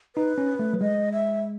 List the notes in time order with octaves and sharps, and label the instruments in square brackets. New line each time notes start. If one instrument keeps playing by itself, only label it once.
[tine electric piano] D#4 [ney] B4
[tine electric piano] C#4
A3
F#3
[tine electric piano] G#3 [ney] D#5
[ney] E5